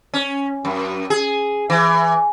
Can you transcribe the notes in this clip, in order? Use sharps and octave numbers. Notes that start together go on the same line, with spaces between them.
C#4
F#2
G#4
E3